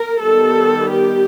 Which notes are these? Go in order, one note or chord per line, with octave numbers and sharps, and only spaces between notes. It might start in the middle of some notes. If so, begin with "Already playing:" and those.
Already playing: A#4
D#3 G3 B3 A4
G4